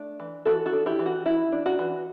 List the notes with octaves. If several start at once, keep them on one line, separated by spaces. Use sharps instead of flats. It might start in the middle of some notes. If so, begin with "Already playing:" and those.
Already playing: A3 D4
E3
E3 F#4 A4
F#4 A4
D4
E4 G4
E3
F#4
E3 E4
D4
F#4
E3